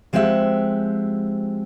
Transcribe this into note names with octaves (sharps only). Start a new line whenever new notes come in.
F3 G#3 C4 G4 E5 F#5